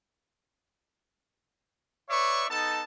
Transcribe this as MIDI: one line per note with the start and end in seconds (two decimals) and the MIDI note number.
2.10 2.46 71
2.10 2.46 73
2.10 2.46 74
2.10 2.46 76
2.10 2.46 85
2.49 2.82 59
2.49 2.82 63
2.49 2.82 69
2.49 2.82 81